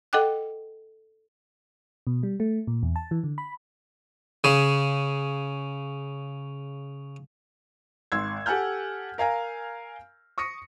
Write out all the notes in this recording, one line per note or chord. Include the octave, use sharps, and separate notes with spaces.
A4 D#5 F#5 G5 D6 F#6
B2
G3
A3
A#2
E2
A5
E3
D3
B5
C#3 G#4
G#1 C6 E6 G#6
G4 A4 F#5 G#5 F6 G6
A#4 F5 G#5 A#5
C#6 D#6 A#6 C#7